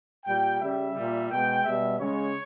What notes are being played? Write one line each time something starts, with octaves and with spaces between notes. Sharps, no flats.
A#2 G3 G5
C#3 G3 E5
A#2 G3
B2 G#3 G5
B2 G3 E5
C#3 G#3 C#5